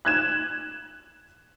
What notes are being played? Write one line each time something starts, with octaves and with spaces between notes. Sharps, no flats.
F#6 G#6 E7